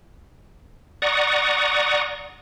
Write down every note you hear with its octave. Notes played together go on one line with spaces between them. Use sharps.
D5 F#5 A#5 C#6 D#6